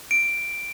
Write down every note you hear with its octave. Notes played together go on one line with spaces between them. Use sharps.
D7